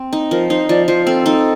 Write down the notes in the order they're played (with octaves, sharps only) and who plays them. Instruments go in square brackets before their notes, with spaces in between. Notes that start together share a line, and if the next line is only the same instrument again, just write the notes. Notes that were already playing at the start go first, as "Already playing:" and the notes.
Already playing: [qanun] C4
D#4
[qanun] F3 [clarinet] A#4
[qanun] D#4 [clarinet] C5
[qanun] F3 [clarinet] D5
[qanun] F3 [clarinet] C5
[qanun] C4 [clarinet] A4
[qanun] D#4